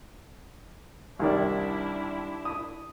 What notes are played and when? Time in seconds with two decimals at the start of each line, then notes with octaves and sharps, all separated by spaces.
1.19 C2 D#3 D4 E4 D5
2.45 D#6